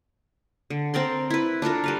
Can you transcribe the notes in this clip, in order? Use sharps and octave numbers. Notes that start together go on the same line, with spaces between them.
D3
C4 A#4 D5 C6
E4 B4
D4 F4 A4 A#4
G3 B4 F5